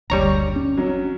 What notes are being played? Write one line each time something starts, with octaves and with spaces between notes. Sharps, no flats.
F#1 D2 G3 C#5 A#5
C#4
F#3 C4 C#4